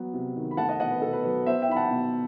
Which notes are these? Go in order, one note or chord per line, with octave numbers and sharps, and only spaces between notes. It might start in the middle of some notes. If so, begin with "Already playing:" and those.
Already playing: F#3 B3
C3
D#3
B5
A3 F#5 A5
D#5 F#5
B2 D#5 F#5
B4
B2 A4
B4
F#3 B4
B3 C5 E5
E5 G5
D#4 B5
F#5 A5
B2